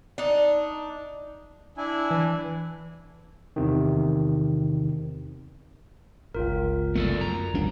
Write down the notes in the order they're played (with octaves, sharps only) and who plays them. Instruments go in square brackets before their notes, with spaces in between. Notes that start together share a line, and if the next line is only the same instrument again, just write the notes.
[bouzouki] D4 D#4
[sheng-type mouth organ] D4 E4 G#5
[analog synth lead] E3
[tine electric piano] E2 C3 D#3
[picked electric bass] G1 C#2 [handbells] F4 A#4
[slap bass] F1 F#3 B3 [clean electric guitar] A3 A4 D5
[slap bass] F#2 [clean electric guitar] A#5
[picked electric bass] D1 G#1 C#4 [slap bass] D2 G3 D4